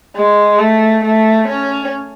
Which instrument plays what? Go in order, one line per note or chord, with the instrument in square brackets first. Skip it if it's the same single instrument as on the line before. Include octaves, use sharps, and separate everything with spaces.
[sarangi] G#3
A3
A3
C#4